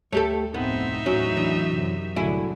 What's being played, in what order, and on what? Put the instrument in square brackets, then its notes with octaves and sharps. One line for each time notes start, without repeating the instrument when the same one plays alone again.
[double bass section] D2 [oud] A3 G4 A4 [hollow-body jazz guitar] C#5
[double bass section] F1 A2 C4 [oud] B3 [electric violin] D#4 E5
[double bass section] E2 A2 [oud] F#3 [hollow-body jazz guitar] C#4
[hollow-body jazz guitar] E3 D4
[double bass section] F#2 C3
[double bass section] C2 D3 [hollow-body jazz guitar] A2 F#3 G#4 [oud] E4